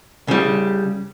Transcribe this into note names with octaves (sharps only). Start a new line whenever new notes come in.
C#3 G3